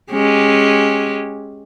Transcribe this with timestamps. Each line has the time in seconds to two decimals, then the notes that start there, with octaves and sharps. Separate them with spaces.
0.12 G#3 C#4 G4